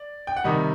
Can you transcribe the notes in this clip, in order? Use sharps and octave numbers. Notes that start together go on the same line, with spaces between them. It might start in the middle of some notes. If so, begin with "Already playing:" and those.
Already playing: D5
G5
F#5
C3 D#3 G3 D#5